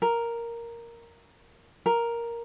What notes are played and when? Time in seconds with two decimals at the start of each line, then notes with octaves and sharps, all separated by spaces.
0.02 A#4
1.86 A#4